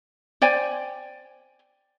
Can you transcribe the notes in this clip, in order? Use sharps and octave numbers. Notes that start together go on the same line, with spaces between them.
C5 D5 G5 G#5